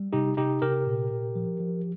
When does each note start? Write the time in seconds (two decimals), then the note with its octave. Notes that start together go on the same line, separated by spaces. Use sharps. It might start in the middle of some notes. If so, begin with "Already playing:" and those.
Already playing: G3
0.13 C3 D#4 G4
0.37 C3 D#4 G4
0.62 C3 G4 A#4
0.87 A#2
1.11 A#2
1.36 F3
1.60 F3